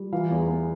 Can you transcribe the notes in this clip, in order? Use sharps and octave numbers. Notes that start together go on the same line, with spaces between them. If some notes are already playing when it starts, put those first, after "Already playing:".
Already playing: G3
E3 F5
E2
B3